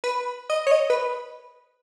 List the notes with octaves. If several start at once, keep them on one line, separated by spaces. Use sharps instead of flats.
B4
D#5
C#5
D#5
B4